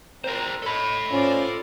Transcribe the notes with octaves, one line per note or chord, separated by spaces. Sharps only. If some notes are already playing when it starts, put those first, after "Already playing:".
C4 A#4 C5 A#5
A4 C#5 D#5 B5
C#4 F4 C5 D5